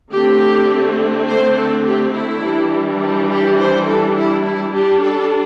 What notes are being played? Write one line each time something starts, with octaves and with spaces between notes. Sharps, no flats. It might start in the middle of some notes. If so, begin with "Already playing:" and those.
D3 A3 C4 G4
C5
A4
G4
E4
E3 G3 D4
G4
G4
C5
A4
E4
E4
G3 D4 G4
A4